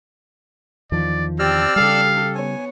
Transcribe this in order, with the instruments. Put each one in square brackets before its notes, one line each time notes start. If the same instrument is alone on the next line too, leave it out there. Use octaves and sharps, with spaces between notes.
[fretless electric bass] E2 D#3 F3 [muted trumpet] D5
[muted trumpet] C4 [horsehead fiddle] G4 A5 [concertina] D5 E6 F6
[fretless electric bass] C#3 G3 [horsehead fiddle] G4 A4 [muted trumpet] F5
[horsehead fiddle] B3 C#5 [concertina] G#5